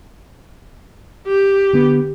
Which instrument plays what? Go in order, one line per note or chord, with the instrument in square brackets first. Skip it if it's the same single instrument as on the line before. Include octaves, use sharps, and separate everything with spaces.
[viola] G4
[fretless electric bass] D3 B3